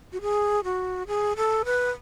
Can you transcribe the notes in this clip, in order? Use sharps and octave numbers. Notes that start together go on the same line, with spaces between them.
F#4
G#4
F#4
G#4
A4
B4